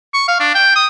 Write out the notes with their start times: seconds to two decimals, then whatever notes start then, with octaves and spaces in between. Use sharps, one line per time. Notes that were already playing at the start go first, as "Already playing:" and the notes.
0.14 C#6
0.28 F5
0.40 D4
0.55 G5
0.76 D#6